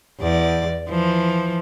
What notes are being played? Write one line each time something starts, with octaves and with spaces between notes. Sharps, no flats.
E2 D5
E3 F3